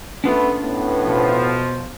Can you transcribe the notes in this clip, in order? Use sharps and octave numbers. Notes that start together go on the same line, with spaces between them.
A3 B3 C#4 D4 F4
A2 B3
B2 F3